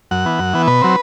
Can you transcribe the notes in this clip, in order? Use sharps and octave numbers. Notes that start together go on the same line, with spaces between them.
F#2 F#5
E3 B3
F#2
E3 B3
B2 B4
F#3 C4